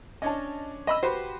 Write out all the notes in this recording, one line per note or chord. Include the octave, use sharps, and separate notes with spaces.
C#4 D4 C#5 D#5 A5
D#5 B5 E6
F#4 G4 B4 C5